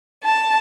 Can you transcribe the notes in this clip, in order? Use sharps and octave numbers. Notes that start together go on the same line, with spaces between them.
A5